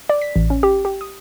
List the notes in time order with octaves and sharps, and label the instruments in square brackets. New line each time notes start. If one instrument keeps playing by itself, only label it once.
[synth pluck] D5
B6
A1
C#4
G4
G4
D#6